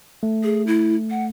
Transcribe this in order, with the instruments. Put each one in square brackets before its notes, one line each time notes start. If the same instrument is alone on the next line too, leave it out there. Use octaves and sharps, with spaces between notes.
[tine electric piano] A3
[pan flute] G#4
E4
F#5